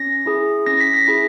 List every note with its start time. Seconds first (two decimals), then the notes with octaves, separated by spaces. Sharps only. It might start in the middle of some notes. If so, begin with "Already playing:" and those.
Already playing: C#4 A#6
0.26 E4 G#4
0.66 C#4 A#6
0.81 B6
0.94 A#6
1.08 E4 G#4